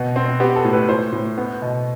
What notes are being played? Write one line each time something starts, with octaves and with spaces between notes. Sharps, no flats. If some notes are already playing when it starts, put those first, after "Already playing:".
Already playing: B2 B3
C4
B3 G4
A4
A2
B4
A2 C5
A2
B3
B2